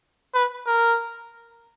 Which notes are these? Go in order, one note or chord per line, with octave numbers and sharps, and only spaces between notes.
B4
A#4